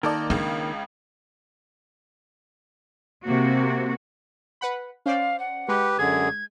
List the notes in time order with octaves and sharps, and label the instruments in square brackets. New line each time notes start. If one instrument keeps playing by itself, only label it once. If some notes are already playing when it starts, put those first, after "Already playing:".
[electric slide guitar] D#3 A#3 [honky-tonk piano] D#4 A4 D5
[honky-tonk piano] C#2 C#3 [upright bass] D4
[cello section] C3 A#3 C4 F#4
[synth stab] B4 F#5 B5
[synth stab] C#4 C5 D5 [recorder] F5
[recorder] F#5
[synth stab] G#3 [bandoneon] G4 B4
[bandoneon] F#2 D3 G#4 [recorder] G#6